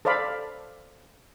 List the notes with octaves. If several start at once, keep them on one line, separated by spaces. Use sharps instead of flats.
A4 C5 D5 F5 B5